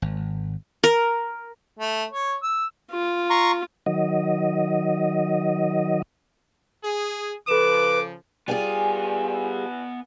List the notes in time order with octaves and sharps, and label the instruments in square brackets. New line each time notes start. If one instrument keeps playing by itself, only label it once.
[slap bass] G#1
[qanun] A#4
[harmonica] A3
C#5
E6
[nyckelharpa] F4
[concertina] A#5 C6 C#6
[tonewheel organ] D#3 F#3 D#5
[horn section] G#4
[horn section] C#3 F3 [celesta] A4 E7 [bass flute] B4 [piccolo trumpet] D6
[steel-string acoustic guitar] G3 F4 G#4 [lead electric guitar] B3 G#5